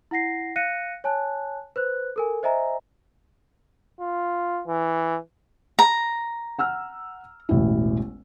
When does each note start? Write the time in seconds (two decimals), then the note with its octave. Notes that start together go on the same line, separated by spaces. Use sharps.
0.11 E4 F#5 A#6 C7
0.56 F5 F#6 A#6 C#7 D#7
1.04 C#5 G#5 A5 F#6
1.76 B4 C5 F#6
2.16 A4 A#4 G#5
2.43 C5 D#5 E5 G#5 A#5
4.01 F4
4.67 E3
5.79 A#5
6.59 F#5 E6 F6
7.49 E1 A1 E4